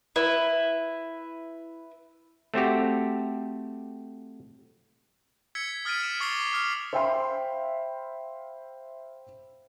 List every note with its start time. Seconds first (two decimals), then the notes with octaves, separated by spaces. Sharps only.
0.16 E4 B4
2.54 A3 C4 F#4 G4
5.55 E6 G#6 B6 C#7
5.85 D#6 F6 A6 B6 D7 D#7
6.03 E7
6.20 C#6 D6 A6 C7 F7 G7
6.52 D6 D#6 F6 C7 F7
6.93 C5 E5 F5 G5 B5 C6